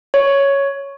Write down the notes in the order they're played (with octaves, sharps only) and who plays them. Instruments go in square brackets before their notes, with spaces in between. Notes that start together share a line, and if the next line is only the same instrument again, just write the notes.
[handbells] C#5